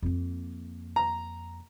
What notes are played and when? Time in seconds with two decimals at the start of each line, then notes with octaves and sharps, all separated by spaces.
0.02 F2 A#3
0.96 A#5